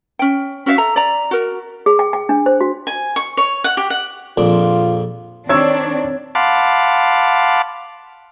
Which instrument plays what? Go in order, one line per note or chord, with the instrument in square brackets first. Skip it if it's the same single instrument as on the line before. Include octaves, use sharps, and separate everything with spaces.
[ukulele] C#4 G5
C#4 F#4 E5 F5
A4 A#5
D5 A#5
F#4 A#4
[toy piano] G#4
G5
G5
D4
C5
F#4
[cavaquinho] G#5
C#6
C#5
F#5
G4
F#5
[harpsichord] A#1 F2 D4 [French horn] F4
[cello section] D#3 C4 D4 [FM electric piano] C#5 [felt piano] C#6 E6 G#6
[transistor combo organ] F5 F#5 A5 B5 C6 D6